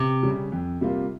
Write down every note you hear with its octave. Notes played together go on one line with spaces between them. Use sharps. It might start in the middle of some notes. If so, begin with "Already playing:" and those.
Already playing: C3
C#3 G3 C#4
F2
C3 G3 A#3 F4